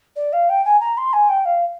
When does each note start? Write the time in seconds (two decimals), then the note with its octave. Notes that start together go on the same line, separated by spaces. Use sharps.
0.16 D5
0.32 F5
0.49 G5
0.64 G#5
0.80 A#5
0.97 C6
1.13 G#5
1.28 G5
1.45 F5